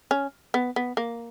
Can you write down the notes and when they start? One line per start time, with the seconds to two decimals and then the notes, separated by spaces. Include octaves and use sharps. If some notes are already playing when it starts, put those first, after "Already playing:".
0.11 C#4
0.54 B3
0.76 B3
0.97 A#3